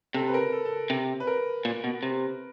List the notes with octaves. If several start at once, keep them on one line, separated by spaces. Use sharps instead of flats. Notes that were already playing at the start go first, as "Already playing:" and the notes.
C3 A4
B4
A#4
A4
A4
C3
B4
A#4
A#2
B2
C3